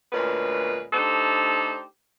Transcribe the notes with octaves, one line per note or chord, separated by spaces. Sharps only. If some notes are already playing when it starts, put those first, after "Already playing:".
D2 A#2 G#3 C#4 B4
A3 D4 D#4 G4 A4 C5